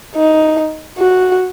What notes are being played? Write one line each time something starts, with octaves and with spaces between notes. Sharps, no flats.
D#4
F#4